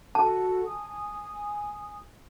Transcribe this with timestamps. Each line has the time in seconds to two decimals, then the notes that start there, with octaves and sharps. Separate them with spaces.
0.15 F#4 A4 A5
0.65 G#5 D#6